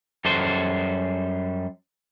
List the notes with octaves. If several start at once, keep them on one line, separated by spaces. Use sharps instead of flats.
F#2 G3 A4 C5 C6